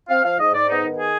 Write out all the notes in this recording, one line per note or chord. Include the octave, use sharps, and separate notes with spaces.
C4 F5
F3 F5
G#2 D#5
G#2 D5
B3 D#4
D#3
G#4